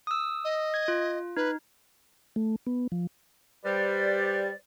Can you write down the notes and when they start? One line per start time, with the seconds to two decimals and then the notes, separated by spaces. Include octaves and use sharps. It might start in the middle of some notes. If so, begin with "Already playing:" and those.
0.07 D#6 E6
0.44 D#5
0.74 G#6
0.88 F4
1.37 D#4 B4
2.36 A3
2.66 B3
2.92 F3
3.65 G3 B4 C5 D5